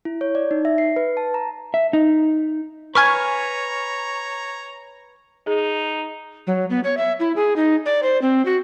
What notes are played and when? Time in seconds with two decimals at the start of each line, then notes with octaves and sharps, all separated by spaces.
0.05 E4
0.21 C#5
0.35 D5
0.51 D#4
0.65 E5
0.78 C7
0.96 B4
1.17 A5
1.34 A#5
1.74 E5
1.93 D#4
2.95 B4 C#5 G#5 A#5 C#6 F6 G#6
5.47 D#4 G#4
6.47 F#3
6.70 B3
6.84 C#5
6.97 E5
7.20 E4
7.36 G#4
7.56 D#4
7.86 D5
8.03 C5
8.22 C4
8.45 F#4